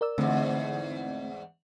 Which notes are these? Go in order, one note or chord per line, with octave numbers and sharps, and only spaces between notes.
A#4 D5 E6
E2 G#2 D3 A3 C4